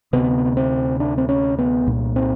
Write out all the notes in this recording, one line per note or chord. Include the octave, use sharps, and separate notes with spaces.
D2 C3 B3
C4
D4
C4
C#4
B3
C2 A#2
C4